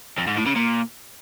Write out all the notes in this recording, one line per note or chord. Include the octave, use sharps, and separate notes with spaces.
F2
G#2
A2
C#3
A#2